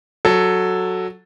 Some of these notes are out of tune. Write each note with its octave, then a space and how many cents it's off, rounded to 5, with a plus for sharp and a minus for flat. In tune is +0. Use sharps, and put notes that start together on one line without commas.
F#3 -5 A4 +0